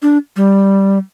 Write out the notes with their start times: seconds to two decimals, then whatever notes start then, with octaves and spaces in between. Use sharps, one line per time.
0.02 D4
0.36 G3